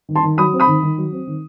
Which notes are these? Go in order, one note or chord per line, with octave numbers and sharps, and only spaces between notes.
D#3
A5 C6
D#3
F#3 B5 D#6
C4
B5 D#6
D#3
D#3
F#3
C4
D#3